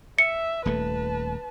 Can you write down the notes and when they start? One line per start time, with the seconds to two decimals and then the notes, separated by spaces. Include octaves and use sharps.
0.18 E5 C#7
0.66 D#1 D#2 A3 B4 A5